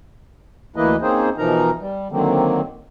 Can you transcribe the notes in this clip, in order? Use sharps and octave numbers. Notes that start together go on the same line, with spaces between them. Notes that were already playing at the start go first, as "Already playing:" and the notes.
D2 E3 A#3 E4 B4 D#5
A#3 C4 C#4 D#4 G#4 C5
B2 E3 F3 D#4 A#4 A#5
G3
D3 D#3 F#3 A#3 C4